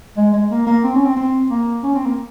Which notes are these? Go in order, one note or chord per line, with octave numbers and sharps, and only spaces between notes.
G#3
G#3
A#3
A#3
C4
C#4
C4
C4
A#3
C#4
C4
A#3